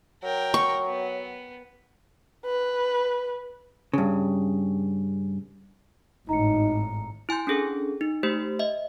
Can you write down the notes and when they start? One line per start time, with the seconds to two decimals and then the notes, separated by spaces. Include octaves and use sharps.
0.23 F#3 A#4 G5
0.54 C#6
0.86 B3
2.46 B4
3.93 G2 C#3
6.29 G#1 A2 D#4 A#5 C#7
7.29 E4 G#5 C6 G6
7.47 C#4 D4 G#4 A4
8.01 D#4
8.23 A3 G4 C5
8.59 D#5 E5